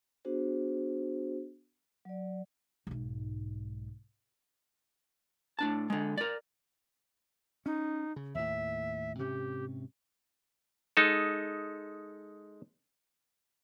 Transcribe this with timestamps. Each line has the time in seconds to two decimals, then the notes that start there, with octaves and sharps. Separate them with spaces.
0.25 B3 D4 F#4 G#4 C5
2.05 F#3 D5
2.87 B1 G#2
5.59 A2 D4 A5
5.90 D3 G#3
6.18 A#4 D5
7.66 C#4 D#4
8.16 C#3
8.35 D#2 A2 E5
9.18 G#2 C3 C#4 G4
10.97 G#3 D#4 A4